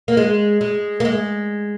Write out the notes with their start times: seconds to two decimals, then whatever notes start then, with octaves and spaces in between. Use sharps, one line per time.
0.08 A#3
0.17 G#3
0.61 G#3
1.00 A#3
1.05 G#3